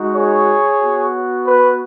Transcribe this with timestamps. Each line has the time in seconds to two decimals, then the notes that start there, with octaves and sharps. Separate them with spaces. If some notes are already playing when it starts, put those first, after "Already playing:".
Already playing: G#3 D#4 F#4
0.14 G#4 C#5
0.80 B3 F#4
1.45 B4